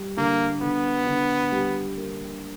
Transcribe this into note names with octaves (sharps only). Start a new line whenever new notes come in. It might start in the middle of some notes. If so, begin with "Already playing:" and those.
Already playing: G3
D3 A#3
D3 B3
D3
G3
A#3